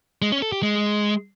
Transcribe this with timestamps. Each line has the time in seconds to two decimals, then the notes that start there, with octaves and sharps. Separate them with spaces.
0.22 G#3
0.32 C#4
0.42 A4
0.52 G4
0.62 G#3